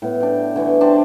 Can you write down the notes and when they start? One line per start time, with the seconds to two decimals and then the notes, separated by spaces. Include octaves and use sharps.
0.02 A2 B3
0.20 D4 G5
0.56 D3 E3 A3 B3
0.81 D4 G4 C5 A5